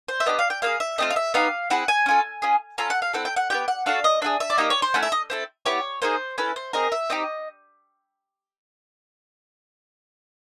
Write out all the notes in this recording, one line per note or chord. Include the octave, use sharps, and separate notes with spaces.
C5
E5
B3 D4 G4 D#5
F5
G5
A#3 D#4 G#4 F5
E5
A3 C4 F4 D#5
F5
E5
B3 D#4 G4 F5
C4 E4 G#4 F#5
G#5
C#4 F4 A4
C#4 F4 G#4
C#4 F4 A4 A#5
F#5
F5
C4 E4 A4 F#5
G5
F#5
B3 E4 G4 G5
F#5
D4 F#4 A4 F5
D#5
D4 F4 G#4 E5
E5
D5
A#3 D#4 G4 D#5
C#5
C5
A3 C#4 E4 F#5
E5
D#5
C4 E4 A4
B3 E4 G4 C#5
A#3 D#4 G#4 C5
C#4 E4 A4 B4
C5
C4 D#4 G#4 A#4
E5
C4 D#4 G4 D#5